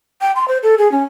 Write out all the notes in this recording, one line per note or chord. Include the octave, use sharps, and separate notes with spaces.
G5
C6
C5
A4
G#4
C#4